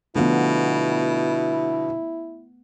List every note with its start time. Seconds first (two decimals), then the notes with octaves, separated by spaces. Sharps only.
0.16 B2 D3 F3 A3 B3 E4